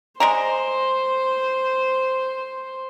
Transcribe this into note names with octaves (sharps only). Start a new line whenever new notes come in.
G#3 C5 D5 A#5